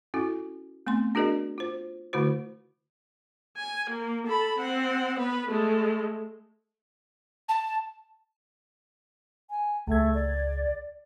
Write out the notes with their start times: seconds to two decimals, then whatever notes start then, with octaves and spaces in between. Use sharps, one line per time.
0.14 C#4 E4 F#4 A4
0.87 A3 B3 C4 C6
1.15 D4 F#4 G#4 A#4 D5 D#5
1.58 F4 C5
2.13 D3 A3 E4 F#4 C5
3.57 G#5
3.90 A#3
4.27 A4 B5
4.58 C4 F#5
5.19 B3 B4
5.48 G#3 A3
7.49 A5
9.50 G#5
9.87 C#2 A3 G#6
10.14 D5